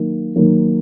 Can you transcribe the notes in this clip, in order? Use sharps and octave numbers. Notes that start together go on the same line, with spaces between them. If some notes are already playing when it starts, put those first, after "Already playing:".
Already playing: D#3 F#3 A#3
D#3 F#3 A#3